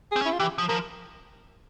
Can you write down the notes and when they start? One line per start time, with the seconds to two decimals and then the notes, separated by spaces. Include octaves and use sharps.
0.12 G#4
0.16 C4
0.21 C#4
0.26 E4
0.33 F4
0.40 E3 G4
0.58 F3
0.68 F3 A#4